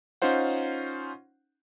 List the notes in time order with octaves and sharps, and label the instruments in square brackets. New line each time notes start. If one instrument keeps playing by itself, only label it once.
[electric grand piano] C#4 D#4 F4 C5 F#5